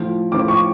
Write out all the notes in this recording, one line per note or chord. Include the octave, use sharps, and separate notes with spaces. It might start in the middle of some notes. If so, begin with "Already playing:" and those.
Already playing: A2 F3
A2 F3 D6
C#6